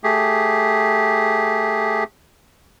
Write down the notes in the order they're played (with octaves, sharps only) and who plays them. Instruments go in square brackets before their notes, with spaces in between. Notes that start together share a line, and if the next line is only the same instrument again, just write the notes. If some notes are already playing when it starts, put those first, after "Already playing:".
[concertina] A3 G4 G#4